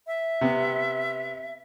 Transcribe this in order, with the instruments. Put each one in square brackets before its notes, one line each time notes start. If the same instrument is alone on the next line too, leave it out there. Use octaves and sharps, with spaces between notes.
[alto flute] E5
[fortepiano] C3 B3